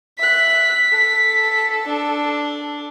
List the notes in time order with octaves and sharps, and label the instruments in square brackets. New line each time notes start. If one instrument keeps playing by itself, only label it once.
[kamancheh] E5 F#6 [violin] B6
[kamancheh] A4
[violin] D4